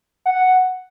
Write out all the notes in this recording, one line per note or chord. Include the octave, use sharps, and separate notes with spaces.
F#5